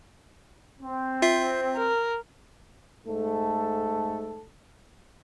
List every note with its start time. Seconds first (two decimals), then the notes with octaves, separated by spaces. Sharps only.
0.80 C4
1.22 F4 E5 C7
1.76 A#4
3.06 G#2 A3 A4